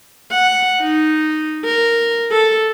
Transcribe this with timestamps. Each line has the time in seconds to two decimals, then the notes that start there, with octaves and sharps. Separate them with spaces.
0.32 F#5
0.81 D#4
1.65 A#4
2.31 A4